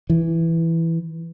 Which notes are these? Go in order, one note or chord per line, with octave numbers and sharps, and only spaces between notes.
E3